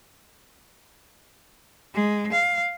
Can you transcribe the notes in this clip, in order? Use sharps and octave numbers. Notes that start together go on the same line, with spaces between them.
G#3
F5